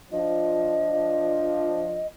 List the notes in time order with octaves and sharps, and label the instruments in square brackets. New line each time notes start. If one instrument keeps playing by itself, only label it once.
[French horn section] F3 D4 F4 [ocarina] D#5